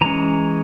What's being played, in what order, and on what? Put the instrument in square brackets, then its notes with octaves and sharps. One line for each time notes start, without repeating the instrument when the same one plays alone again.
[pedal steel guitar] E3 G#3 C#4 A#5